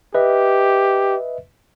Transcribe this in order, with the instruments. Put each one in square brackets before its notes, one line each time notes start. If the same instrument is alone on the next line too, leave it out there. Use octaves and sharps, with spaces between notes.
[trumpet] G4 [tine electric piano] B4 D#5 E5